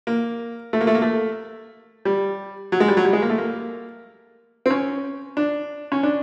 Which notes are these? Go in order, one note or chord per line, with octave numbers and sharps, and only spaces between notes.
A#3
A3
A#3
A3
A#3
A3
G3
F#3
G#3
G3
F#3
G3
G#3
A#3
A3
A#3
C4
C#4
D4
C#4
D4